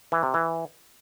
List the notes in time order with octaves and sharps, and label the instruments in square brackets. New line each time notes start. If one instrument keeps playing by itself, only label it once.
[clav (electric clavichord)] E3
C3
E3